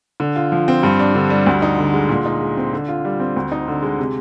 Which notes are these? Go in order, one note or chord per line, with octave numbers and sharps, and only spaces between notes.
D3
F4
F3
C4
G2
D4
D3
G3
D2
D#4
D3
G#3
A#2
D#4
G#3
C4
D3
F4
G3
C4
D2
D#4
D3
G#3
C3